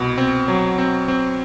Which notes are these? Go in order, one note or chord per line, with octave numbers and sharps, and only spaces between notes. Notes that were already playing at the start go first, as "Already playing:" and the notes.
Already playing: C2 B2
C4
F#3
C4
C4